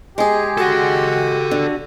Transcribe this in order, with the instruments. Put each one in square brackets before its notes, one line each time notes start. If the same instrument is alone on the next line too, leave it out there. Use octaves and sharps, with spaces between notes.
[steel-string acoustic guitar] G#3 G#4 [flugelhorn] G4
[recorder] F#4 [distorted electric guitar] A4 F#5
[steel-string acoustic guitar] D3